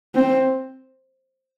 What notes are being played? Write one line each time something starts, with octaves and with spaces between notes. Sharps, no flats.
C4